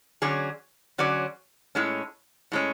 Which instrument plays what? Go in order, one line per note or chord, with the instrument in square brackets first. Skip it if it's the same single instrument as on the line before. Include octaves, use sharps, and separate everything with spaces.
[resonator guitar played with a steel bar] D3 F#3 C#4 G#4 D5
D3 F#3 C#4 G#4 D5
A2 G#3 C#4
A2 G#3 C#4